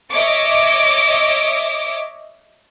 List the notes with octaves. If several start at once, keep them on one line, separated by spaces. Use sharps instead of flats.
C#5 D#5 E5 D6